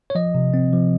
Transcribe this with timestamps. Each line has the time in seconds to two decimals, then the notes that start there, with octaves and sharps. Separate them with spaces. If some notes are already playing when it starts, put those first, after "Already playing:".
0.10 C#5
0.15 F3 D#5
0.35 C3
0.54 C4
0.73 F3